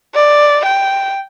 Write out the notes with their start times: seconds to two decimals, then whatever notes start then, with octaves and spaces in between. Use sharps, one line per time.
0.15 D5
0.65 G5